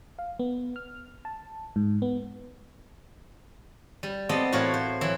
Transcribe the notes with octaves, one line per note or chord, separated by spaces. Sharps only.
F5
B3
F6
A5
G#2
B3
G3
B3 C4 A4 D5 D#5
A2 E3 F#4 A#4 C#5 F5
C5
E3 F#3 E4